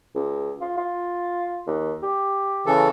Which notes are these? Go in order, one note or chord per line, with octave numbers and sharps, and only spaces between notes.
C#2
F4
F4
D#2
G4
C#3 E3 A4